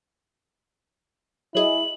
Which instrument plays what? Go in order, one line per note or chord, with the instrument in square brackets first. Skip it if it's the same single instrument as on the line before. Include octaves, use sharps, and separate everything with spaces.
[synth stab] F#3 G#4 D#5 [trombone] E4 [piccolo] F#7